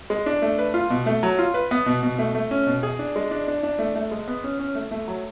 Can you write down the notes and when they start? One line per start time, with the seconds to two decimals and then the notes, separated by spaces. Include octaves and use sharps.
0.10 G#3
0.26 D4
0.42 A3
0.58 B4
0.74 F4
0.90 B2
1.06 A3
1.23 F#3
1.39 F4
1.54 B4
1.71 B3
1.86 B2
2.03 B2
2.19 A3
2.35 A3
2.51 C#4
2.67 B2
2.83 G#4
2.99 D4
3.16 G#3
3.31 D4
3.48 D4
3.63 D4
3.79 A3
3.95 A3
4.11 G#3
4.28 B3
4.44 C#4
4.59 C#4
4.75 A3
4.91 A3
5.08 F#3